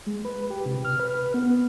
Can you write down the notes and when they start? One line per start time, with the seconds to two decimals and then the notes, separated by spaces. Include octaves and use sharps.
0.06 G#3
0.25 B4
0.50 G4
0.66 C3
0.85 F6
1.00 B4
1.34 B3